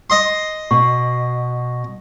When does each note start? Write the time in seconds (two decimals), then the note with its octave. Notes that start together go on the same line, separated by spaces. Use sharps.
0.10 D#5 C6
0.71 B2 C#6